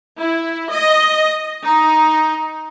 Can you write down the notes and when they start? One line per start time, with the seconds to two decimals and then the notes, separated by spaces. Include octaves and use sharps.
0.19 E4
0.71 D#5
1.63 D#4